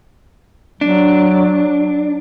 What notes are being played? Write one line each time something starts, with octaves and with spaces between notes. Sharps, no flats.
F#3 D4